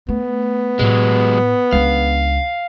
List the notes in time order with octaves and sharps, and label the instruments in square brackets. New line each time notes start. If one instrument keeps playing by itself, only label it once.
[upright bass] A3 [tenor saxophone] B3
[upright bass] A2 [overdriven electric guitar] F#3 G#3
[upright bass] C#2 D4 [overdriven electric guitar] F5